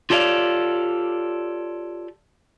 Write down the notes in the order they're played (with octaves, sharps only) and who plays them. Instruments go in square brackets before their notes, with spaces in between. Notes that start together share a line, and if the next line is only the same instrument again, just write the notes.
[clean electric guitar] F4 G4 A4 C#5 D5 F5